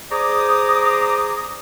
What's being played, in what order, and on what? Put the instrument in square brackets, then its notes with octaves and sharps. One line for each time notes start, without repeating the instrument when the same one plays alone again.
[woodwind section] G#4 C5 D5 A#5 D6 D#6